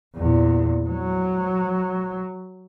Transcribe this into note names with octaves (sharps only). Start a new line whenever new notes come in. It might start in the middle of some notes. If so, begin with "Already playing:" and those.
E2 A#2
F#3